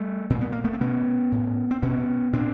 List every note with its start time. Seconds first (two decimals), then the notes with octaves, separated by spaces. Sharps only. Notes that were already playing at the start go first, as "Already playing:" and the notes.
Already playing: G3 A3
0.30 A#2 C4
0.41 B3
0.52 A#3
0.64 A3 B3
0.73 C4
0.80 B2 B3 C#4
1.32 A2
1.71 C4
1.82 B2 B3 C#4
2.33 A#2 C4 D4